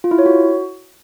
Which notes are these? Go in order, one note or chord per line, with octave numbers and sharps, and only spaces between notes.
F4
E4
C#5
F#4